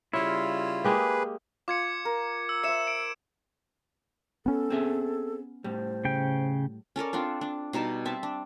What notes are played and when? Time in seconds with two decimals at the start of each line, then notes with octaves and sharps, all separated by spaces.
0.13 C#3 G3 E4 F4 C#5 F5
0.84 G#3 A#3 G4 G#4 B4
1.68 F4 D6 G#6 C#7
2.05 A#4
2.49 E6
2.64 C5 E5 C#7 E7
2.87 D7
4.46 B3 C#4 A4
4.70 C4 G#4 E5
5.64 A2 G3 C5
6.05 C#3 G5
6.96 C#4 A4 A#4 D5
7.13 C4 D4 F4 A4
7.41 D4
7.73 B2 G3 D#4 A5
8.05 C4 E5 A5
8.23 D4